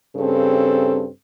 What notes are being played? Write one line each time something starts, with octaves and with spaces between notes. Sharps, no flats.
G2 C#3 C4 A4